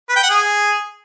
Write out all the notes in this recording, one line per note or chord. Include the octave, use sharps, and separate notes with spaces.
B4
G5
F#5
G#4